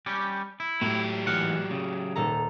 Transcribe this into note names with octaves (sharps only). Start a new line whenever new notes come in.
G3 C#4 G4
E4
A2 F#3 G4
G#2 E3 F#5 F6
C#3
D#1 A4 A#5